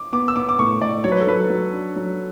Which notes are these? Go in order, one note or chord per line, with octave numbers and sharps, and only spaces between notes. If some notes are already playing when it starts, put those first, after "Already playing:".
Already playing: D6
B3 D6
E6
B3 D6
D6
A2 C#6
A2 D5
F#3 C#5
B4
A4
F#3 B4
F#3
D4
F#3